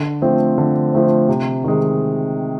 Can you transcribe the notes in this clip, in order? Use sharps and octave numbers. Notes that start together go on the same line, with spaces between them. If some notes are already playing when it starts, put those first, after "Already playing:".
Already playing: D3
F3 A3 C4
D3
F3 A3 C4
C3
D#3 G#3